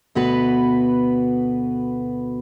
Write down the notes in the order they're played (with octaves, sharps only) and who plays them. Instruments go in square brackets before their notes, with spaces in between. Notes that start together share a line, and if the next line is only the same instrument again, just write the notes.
[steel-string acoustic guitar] D2 B2 B3 F#4 B4